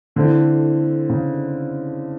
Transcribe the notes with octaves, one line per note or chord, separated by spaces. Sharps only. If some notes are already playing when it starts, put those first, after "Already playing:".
D3 E3 A3 C4 E4
C#3